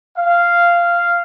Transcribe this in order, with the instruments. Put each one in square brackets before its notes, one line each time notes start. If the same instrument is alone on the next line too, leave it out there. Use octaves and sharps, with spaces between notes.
[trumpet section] F5